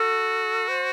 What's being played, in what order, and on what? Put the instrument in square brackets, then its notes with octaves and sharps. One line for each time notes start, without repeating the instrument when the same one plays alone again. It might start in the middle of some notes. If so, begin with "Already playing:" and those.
Already playing: [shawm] F#4 [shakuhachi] A4
[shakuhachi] C5